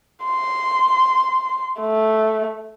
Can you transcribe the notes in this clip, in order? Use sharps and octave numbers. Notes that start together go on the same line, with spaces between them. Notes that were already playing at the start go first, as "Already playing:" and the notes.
C6
A3